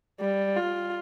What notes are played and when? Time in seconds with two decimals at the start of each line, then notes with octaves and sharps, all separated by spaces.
0.20 G3
0.56 F4